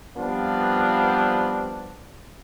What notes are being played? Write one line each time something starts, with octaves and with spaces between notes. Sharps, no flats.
F3 G3 B3 C4 D4 F4